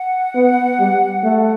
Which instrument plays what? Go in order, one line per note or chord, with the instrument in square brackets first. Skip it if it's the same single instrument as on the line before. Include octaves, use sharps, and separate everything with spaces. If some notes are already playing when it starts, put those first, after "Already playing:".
Already playing: [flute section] F#5
[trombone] B3
G3
A3